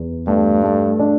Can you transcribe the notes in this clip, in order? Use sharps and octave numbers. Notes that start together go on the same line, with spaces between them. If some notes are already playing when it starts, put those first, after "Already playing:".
Already playing: E2
G2 A3
A3
D4